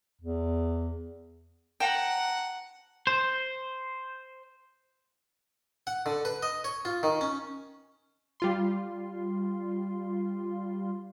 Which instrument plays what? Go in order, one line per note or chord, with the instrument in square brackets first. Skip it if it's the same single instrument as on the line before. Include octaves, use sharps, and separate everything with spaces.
[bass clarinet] E2
[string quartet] F#5 [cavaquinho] G5 A5 A#5
[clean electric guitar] C5
[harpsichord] F#5
D3
B4
D#5
C#5
F4
D#3
C#4
[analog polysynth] G3 F4 C6